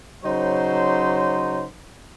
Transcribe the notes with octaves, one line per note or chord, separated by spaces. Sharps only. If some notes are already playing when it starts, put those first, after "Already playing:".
C#3 F#3 D#4 C5